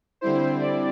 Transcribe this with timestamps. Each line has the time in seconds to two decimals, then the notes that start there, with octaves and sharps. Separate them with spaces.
0.21 D3 G3 C4 E4 C5
0.61 D5